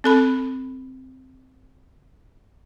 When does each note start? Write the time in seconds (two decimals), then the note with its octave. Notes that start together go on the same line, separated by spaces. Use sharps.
0.04 C4 A4 B5